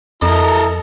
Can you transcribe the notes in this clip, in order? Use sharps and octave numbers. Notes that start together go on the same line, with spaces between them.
F2 E4 A4 A#4 D#5 A#5